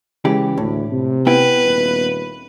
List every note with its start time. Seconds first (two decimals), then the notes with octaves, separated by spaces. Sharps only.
0.25 C#3 E3 G#3 G4
0.58 D2 A2
0.92 C3
1.27 B3 E4 B4 G5
1.63 D#1